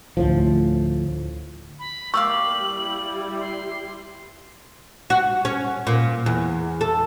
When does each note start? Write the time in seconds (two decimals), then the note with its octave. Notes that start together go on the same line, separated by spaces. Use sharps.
0.17 D2 A2 F3
1.79 B5
2.14 A#3 G4 D5 F5 C#6 E6 F#7
2.56 G3 E4
3.40 C6
5.10 F#4
5.45 C#4
5.87 A#2
6.26 E2
6.81 A4